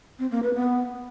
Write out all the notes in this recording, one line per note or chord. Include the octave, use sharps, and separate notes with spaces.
C4
A#3
B4
B3